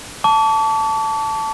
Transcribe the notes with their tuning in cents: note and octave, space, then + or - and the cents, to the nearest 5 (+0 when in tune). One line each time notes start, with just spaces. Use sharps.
A5 +0 D6 -45